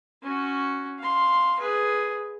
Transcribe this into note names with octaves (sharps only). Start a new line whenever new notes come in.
C#4 F#4
F5 C6
G#4 B4